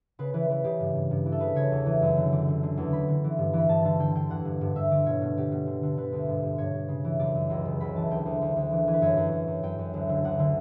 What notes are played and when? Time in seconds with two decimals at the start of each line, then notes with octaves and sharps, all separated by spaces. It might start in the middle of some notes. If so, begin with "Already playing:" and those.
0.19 C#3 B4
0.34 E3 B4
0.49 E3 B4
0.64 C#3 G4
0.80 G2
0.95 G2
1.11 G2
1.26 E3
1.32 A4
1.40 C#3 B4
1.55 C#3 C#5
1.72 E2
1.86 E3
2.02 F#2
2.17 D3
2.32 D3 D5
2.48 D3
2.63 D3
2.77 E2
2.93 D3 B5
3.08 D3
3.24 E3
3.38 G2
3.53 E3 B5
3.69 G2 A5
3.84 D3 A5
3.99 D3 G5
4.15 D3 G5
4.29 E2 F#5
4.45 G2
4.61 G2
4.76 G2 E5
4.91 D3 D5
5.06 B2 C#5
5.22 B2
5.37 B2 G4
5.51 B2
5.67 D3
5.83 D3
5.97 D3 B4
6.12 D2
6.29 G2
6.43 G2
6.58 G2 C#5
6.74 G2
6.88 C#3
7.04 E3
7.19 F#2 D5
7.35 F#2
7.50 C#2
7.65 C#3
7.80 C#2 B5
7.96 E3 A5
8.10 D2 G5
8.25 D2
8.42 D2
8.56 D2
8.71 E3
8.87 E3
8.93 B4
9.02 F#2 C#5
9.17 F#2
9.32 F#2
9.47 F#2
9.63 F#2 G5
9.78 F#2
9.94 D2
10.09 D3
10.24 D2 F#5
10.39 D3